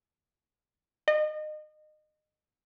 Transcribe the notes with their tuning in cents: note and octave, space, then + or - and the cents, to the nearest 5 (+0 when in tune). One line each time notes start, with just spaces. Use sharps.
D#5 -25